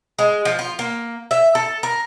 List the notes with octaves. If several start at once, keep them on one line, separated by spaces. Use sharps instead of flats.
G#3
F3
F4
A#3
E5
A4
A#4